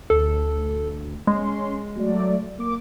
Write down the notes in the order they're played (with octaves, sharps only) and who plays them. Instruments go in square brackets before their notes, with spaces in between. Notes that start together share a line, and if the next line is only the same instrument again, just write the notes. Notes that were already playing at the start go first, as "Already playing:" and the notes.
[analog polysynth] D2 [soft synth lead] A4
[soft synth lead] G#3 [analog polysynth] C#4 C6
[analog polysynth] F#3 A3 D5
A#3 D6